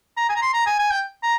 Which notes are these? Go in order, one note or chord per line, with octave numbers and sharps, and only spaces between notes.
A#5
G#5
A#5
C6
A#5
G#5
G#5
G5
A#5